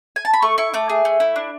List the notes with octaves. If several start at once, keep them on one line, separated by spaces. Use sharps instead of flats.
G#5
A5
B5
A3 C#6
E4 C#6
A3 D6
G#4
A3
E4
D4